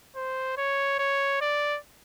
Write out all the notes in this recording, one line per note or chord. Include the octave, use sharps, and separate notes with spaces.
C5
C#5
C#5
D5